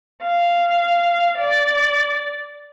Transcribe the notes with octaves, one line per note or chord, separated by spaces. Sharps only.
F5
D5